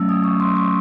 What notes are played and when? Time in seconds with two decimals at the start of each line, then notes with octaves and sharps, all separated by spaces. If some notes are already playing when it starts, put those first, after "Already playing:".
Already playing: F#3 A3 C#4 E6
0.09 D#6
0.24 C#6
0.40 C6
0.56 C#6